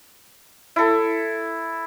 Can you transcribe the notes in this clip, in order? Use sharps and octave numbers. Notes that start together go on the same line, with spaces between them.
E4 A4